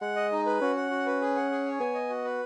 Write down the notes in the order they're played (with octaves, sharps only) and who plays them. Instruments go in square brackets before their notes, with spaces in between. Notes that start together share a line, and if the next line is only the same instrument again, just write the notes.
[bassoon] G#3 [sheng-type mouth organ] F#5
[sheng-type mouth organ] D#5
D#4
B4
[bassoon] C#4 [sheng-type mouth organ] F#4
[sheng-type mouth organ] F#5
F#4
B4
G#4
F#5
G#4
C#5
[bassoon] B3 [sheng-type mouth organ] G#5
[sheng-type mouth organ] D#5
F#4
B4